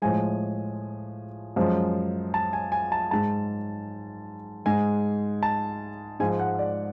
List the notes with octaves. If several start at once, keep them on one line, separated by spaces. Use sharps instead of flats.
A2 F3 G#3 G#5
F#2 F3 G#3
A5
G#5
G#5
A5
G#2 G#3 A5
G#2 G#3 G#5
A5
G#2 F3 G#3 G#5
F#5
D5